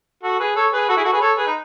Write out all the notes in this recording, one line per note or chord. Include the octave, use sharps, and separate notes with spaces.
F#4 A4
G#4 B4
A4 C#5
G#4 B4
F#4 A4
E4 G#4
F#4 A4
G#4 B4
A4 C#5
G#4 B4
D#4